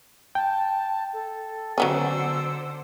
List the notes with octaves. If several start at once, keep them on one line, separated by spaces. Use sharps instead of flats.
G5 A5
A4
D3 F#3 B3 C#4 C5 E6